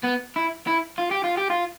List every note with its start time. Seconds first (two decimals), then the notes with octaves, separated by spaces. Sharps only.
0.04 B3
0.36 E4
0.67 E4
0.98 F4
1.11 G4
1.24 F4
1.37 G4
1.50 F4